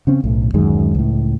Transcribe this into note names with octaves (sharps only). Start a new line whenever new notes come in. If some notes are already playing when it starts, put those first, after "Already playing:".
C#3 C4 C#4
B1 A2
D1 F#2 D#3 G#3
C#2 A2